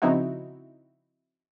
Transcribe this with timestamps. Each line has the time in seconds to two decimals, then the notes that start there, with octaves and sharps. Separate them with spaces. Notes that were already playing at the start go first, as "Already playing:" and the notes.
0.02 C#3 F3 C4 D#4 E4 F#4